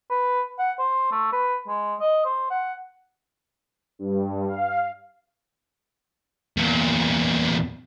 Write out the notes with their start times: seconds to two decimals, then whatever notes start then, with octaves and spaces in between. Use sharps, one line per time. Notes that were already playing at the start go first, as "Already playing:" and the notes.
0.10 B4
0.59 F#5
0.79 C5
1.11 A3
1.33 B4
1.68 G#3
2.00 D#5
2.25 C5
2.50 F#5
3.99 G2
4.47 F5
6.57 E2 A#2